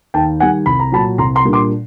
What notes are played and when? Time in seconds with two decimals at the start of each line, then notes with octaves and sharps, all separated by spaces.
0.14 D#2 G5 A5
0.40 D#3 G3 F#5 G#5
0.66 C2 B5
0.80 A#5
0.92 A#2 F#3 A5 B5
1.18 C2 A#5 C6
1.35 A#5 C6
1.44 A#2 G3 A#3 D4
1.53 C6 D6